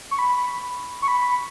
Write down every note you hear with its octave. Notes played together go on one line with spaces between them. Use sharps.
C#6
B5
C#6
B5